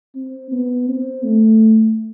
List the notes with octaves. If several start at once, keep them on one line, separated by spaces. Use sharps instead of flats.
C4
B3
C4
A3